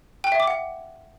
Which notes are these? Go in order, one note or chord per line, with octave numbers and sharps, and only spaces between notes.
G5
E5
D6
F#5